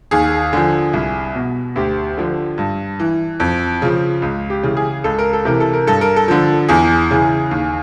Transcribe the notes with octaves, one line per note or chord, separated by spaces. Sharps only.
D#2 G#4
D3 F3
C2
B2
D2 G4
D3 F3
G2
E3
F2
C#3 F3
C#2
G4
C#3 E3
G#4
C#2 A4
A#4
A4
C3 E3 A#4
A4
A#4
G2 A4
A#4
A4
D3 F3
E2 G#4
C#3 E3
D#2